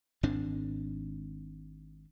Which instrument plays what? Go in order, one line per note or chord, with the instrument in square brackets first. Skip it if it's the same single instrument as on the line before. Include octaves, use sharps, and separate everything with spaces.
[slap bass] G#1 G#2 C4 D4